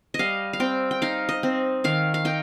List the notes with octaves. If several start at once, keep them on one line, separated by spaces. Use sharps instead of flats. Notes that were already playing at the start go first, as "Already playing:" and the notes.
D#5
G3 F5
F5
C4 G5
G5
D#4 F5
D#5
C4
D#3 F5
F5
D#4 G5